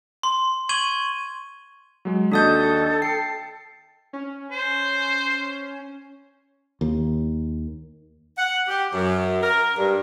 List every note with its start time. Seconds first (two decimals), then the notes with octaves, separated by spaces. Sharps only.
0.23 C6
0.69 C#6 G#6 D#7 F#7
2.05 F#3 G#3
2.32 D#2 D4 F#4 A4 D#5 D#6 G6
3.02 G5 A5 C7 C#7
4.13 C#4
4.51 C5
6.81 D#2
8.37 F#5
8.68 G4
8.93 F#2
9.42 A#4
9.76 G2